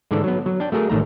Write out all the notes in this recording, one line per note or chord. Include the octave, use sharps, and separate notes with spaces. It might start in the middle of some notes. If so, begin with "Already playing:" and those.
G#2 D3 E3 A4 D5
F#3 B3
F#3
D4 G5
A3 F#4 G#4 A#4
A1 D#3 A3 A#5